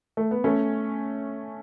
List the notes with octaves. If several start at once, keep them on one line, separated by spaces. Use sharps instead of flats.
A3
B3
A3 C#4